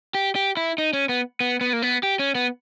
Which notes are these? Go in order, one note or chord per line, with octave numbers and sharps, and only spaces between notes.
G4
G4
E4
D#4
C#4
B3
B3
B3
A#3
B3
G4
C#4
B3